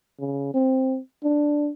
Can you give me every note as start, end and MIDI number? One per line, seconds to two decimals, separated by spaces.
0.20 0.52 49
0.54 0.99 60
1.24 1.71 62